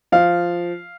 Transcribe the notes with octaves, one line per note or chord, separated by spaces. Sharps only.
F3 F5